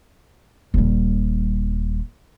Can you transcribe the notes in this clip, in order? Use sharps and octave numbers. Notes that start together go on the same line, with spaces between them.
D#1 G3